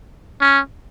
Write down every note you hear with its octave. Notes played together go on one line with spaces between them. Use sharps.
C#4